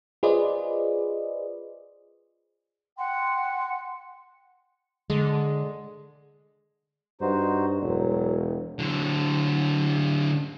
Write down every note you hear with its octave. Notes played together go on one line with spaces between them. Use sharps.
F4 G#4 B4 C5 D5 D#5
F#5 G5 C6
D3 G#3
G2 D#4 F#4 C5
E1 F#3
D3 F#3